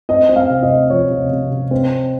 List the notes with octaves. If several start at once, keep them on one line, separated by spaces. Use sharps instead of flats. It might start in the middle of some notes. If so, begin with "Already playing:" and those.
C4 D#5
C4
F5
C3
D#5
C4
F3 C#5
C3
C3
C3
C4